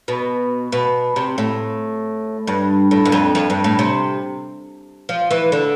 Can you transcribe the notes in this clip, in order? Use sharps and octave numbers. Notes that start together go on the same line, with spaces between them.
B2
B2
C3
A2
G2
A2
G2
F2
F2
G2
A2
C3
F3
E3
D3